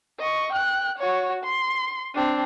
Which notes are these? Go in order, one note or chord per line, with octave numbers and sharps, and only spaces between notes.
D#5 C#6
G5 F#6
F#4 C#5
C6
C4 D4